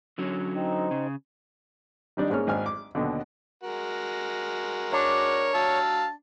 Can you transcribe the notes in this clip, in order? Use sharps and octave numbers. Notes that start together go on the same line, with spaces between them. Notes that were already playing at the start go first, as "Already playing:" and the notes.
D3 F#3 C#4
C4 D#4
C#3
D#3 G3 D4 D#4
G#2 G#3 A#3 C#4 F6
G#1 D4 G#5 F6
D6
D#2 B2 D3
G#3 F#4 A#4
D4 C#5
F#3 F5 A5 E6